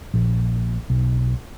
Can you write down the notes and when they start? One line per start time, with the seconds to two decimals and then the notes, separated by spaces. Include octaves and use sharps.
0.14 A#1
0.90 B1